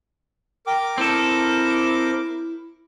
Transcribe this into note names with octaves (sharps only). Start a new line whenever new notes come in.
A#4 G5 D6
C4 E4 A4